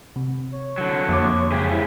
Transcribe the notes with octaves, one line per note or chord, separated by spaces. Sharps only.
C3
C#5
D3 F#3 C#7
F2 A#3 D6
G#2 C#3 G4 G#4
E4